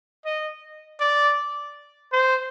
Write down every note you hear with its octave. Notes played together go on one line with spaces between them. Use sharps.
D#5
D5
C5